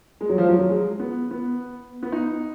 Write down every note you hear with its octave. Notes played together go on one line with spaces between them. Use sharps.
G#3
F#3
F3
F#3
F#3
G#3
B3
B3
B3
D#4